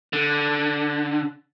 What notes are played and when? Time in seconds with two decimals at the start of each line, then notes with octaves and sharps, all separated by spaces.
0.13 D3